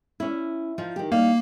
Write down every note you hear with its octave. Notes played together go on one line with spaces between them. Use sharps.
C#4 E4
F3 D#4
D#3 G4
G3 A#3 D#4 F5